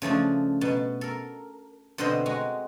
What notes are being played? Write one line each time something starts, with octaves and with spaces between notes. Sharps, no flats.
C#3 F3 A3 D4
B2 A5
A4 A#4
B2 D3 C4 C5 D#5
G#3 F#4 A#5